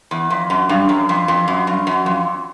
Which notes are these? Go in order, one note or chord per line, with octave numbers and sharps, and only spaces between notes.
E2
F2
F#2
G2
F#2
F2
F2
F#2
G2
F#2
F2